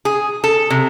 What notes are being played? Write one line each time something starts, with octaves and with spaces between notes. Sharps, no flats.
G#4
A4
C3